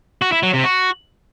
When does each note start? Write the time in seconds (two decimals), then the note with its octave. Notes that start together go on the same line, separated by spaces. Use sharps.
0.22 F#4
0.32 E4
0.43 F#3
0.53 C3
0.64 F#4